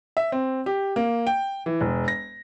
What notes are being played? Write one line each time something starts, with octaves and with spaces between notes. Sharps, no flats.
E5
C4
G4
A#3
G5
E3
E1
A#6